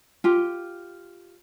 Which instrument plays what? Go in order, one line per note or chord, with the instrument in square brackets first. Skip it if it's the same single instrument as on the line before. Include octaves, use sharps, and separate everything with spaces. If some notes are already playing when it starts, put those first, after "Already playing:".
[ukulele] F4 G4